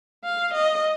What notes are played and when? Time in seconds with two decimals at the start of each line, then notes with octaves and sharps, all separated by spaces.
0.24 F5
0.53 D#5